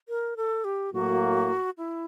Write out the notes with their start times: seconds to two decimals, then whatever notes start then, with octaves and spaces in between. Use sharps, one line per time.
0.09 A#4
0.37 A4
0.64 G4
0.93 A2 F#3 A#3 F#4
1.78 E4